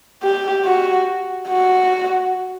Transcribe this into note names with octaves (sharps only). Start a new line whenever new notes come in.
G4
F#4
F#4